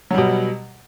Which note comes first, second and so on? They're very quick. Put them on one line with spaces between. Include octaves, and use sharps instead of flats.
F#3 G3 B2